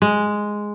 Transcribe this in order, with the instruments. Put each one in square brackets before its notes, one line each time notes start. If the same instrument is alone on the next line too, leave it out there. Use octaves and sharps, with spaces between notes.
[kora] G#3